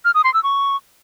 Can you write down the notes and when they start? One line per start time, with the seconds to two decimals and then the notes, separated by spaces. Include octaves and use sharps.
0.05 F6
0.14 D#6
0.24 C6
0.34 E6
0.43 C#6